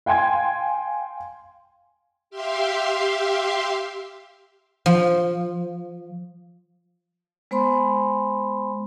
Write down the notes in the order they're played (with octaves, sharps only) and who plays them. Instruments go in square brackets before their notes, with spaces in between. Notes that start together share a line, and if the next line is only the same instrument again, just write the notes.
[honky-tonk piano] F5 G5 G#5 C6 G#6
[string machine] G4 E5 F5 C6
[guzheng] F3
[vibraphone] G#3 B3 C5 G#5 B5 C6